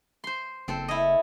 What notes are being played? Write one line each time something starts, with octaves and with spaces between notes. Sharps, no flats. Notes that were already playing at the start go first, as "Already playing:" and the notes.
C5 C6
F#1 C4 A4 C5
E4 C#5 D#5